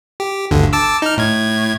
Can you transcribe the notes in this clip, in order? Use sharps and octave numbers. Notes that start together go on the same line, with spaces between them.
G4
G1 D2 D3
A5 D6 E6
D#4 F6
A2 G#6